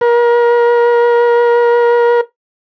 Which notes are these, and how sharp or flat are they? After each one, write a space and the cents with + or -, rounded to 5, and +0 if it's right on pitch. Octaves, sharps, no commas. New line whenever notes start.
A#4 +35